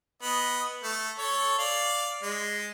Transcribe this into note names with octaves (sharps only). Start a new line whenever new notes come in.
B3 D#5
A3
A4 C#5
D5 F5
G#3